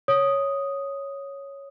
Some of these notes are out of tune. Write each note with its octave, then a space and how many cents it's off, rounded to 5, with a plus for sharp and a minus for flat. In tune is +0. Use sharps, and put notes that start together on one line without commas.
C#5 +0 D#6 +0